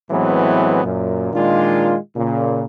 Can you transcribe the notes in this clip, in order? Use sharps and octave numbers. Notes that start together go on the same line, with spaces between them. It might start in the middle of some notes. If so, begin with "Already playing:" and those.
A2 E3 F#3 G#3 B3 C4
F#2 A#2
A#2 D#3 G#3 D4 F4
A#2 C#3